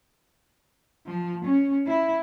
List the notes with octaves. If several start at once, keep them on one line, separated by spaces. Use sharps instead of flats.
F3
C#4
E4